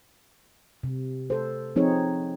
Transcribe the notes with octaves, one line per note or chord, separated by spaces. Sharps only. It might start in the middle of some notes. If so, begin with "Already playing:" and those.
C3
A4 C5
F3 C4 D#4 G#4 C#5